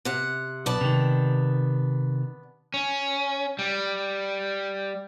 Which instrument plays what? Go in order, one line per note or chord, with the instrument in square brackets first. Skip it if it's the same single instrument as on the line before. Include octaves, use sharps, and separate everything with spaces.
[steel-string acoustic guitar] C3 F#5
[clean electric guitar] B1 [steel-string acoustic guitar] B3 D5 A5
[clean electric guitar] C3 D#3
[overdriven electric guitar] C#4
G3